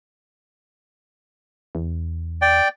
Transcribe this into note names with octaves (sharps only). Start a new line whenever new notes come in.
E2
D5 G5